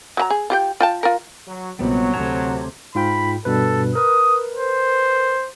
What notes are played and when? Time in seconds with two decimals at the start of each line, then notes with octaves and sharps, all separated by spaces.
0.17 F#3 F#4 A#5
0.30 G#4
0.50 F4 G4 G5
0.80 F4 G5 A5
1.03 F4 A#4
1.48 F#3
1.79 A#1 C3 F#3 G3 B3
2.13 D2 C3 C#5 A5 A#5
2.95 G#2 F4 G5 B5
3.45 G2 B2 A4 B4
3.95 A#4 B4 D#6
4.56 C5